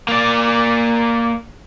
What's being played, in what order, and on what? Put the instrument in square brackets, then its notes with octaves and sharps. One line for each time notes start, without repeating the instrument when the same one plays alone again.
[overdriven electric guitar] A#3 D5